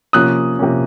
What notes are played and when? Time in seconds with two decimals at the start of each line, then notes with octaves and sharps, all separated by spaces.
0.13 C3 F3 A#3 C#4 D#6 F#6
0.59 C3 F3 A#3 C#4